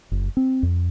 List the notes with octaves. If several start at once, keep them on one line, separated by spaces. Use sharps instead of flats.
F#1
C4
F2